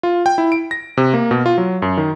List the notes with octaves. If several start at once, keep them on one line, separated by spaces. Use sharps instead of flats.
F4
G5
E4
D7
A#6
C3
A#3
B2
F4
F#3
F#2
D#3